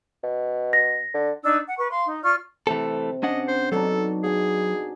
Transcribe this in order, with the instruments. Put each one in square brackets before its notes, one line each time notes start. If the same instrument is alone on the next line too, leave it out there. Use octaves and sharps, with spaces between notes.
[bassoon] B2
[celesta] A#6
[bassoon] D3
[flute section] D4 D#4 E6
F#5
B4 C#6
F5 C6
D#4
F4 D5 C#6 F6
[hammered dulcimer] C3 [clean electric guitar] E3 A3 A4
[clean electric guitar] C#4 D4 F#5 [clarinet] D#5
[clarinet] C5
[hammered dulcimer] B2 D4 D#4 [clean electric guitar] F#3 [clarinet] A4
[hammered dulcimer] F#4 G#5 [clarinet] G#4